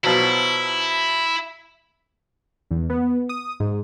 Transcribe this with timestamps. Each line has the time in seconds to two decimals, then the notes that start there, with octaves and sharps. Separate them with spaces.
0.04 B2 F3 F#3 E4
2.71 E2
2.90 B3
3.29 D#6
3.60 G#2